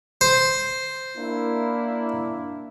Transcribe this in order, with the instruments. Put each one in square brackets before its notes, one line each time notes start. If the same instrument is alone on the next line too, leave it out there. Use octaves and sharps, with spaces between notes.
[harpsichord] C5
[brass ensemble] A#3 D4 E4